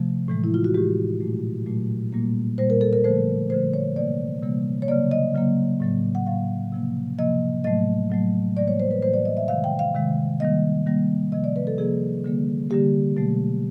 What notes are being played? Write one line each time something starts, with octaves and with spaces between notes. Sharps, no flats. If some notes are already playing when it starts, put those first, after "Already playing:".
Already playing: C3 F3 A3
A2 E3 G#3
E4
F4
F#4
A2 E3 G#3 G4
A#2 F#3 A3
A#2 F#3 A3
A#2 G3 A#3
A#2 G3 A#3 C5
A#4
A4
A#4
D3 F3 A3 C5
D3 F3 A3 C5
C#5
C3 E3 G3 A#3 D5
C3 E3 G3 A#3
C#5
C#3 F#3 A#3 D5
D#5
C#3 F#3 A#3
A2 F#3 A#3
F#5
A2 F#3 A#3 F5
C3 F3 A#3
C3 F3 A#3 D#5
A2 F#3 A3 D#5
A2 F#3 A3
A2 E3 G3 A#3 D5
C#5
C5
B4
A2 E3 G3 A#3 C5
D5
D#5
E5
C3 D#3 G#3 F5
G5
F5
C3 D#3 G#3
D#3 G3 A#3 D#5
D#3 G3 A#3
C3 F3 A#3 D#5
D5
B4
A4
C3 F3 A#3 G#4
D3 G3 A#3
D3 G3 A#3 G4
B2 F#3 A3